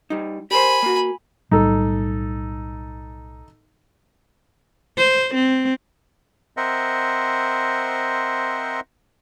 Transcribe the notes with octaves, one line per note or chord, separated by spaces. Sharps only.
G3 D#4
G4 A#4 C5 G#5 B5
A#3 F#4
B1 A2 G3 D#4 A4
C5
C4
C4 A#4 C5 D#5 E5 F#5